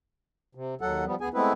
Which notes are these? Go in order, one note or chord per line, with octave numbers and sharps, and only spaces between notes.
C3
D#2 F#3 A4 F#5
F3 G3 B3
D2 B3 G#4 G#5
G#3 A3 B3 C4 E4 B4